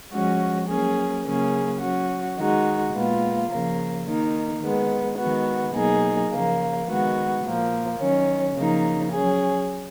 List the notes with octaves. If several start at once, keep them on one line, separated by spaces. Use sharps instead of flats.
F3 G#3 C#4 F#4
F#3 A#3 C#4 G#4
C#3 F#3 A#3 C#4 G#4
F#3 C#4 F#4
D#3 G#3 D#4 F#4
A#2 G#3 B3 F4
C#3 F3 A#3
D#3 A#3 D#4
D#3 G#3 B3
D#3 G#3 B3 F#4
B2 F#3 A#3 D#4 G#4
C#3 F3 A#3
D#3 G#3 B3 F#4
A#2 F3 A#3
D#3 F#3 C#4
C#3 F3 A#3 D#4
F#3 C#4 G#4